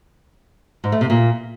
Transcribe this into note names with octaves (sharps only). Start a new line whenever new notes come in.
G#2
A3
C3
A#2